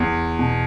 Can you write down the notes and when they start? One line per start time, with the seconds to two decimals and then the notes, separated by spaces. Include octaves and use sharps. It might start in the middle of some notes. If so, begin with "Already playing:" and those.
Already playing: E2
0.39 B2